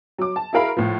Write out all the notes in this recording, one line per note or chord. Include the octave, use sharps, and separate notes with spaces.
F#3 D6
A5
E4 F#4 G#4 A#4 F5 B5
A2 F3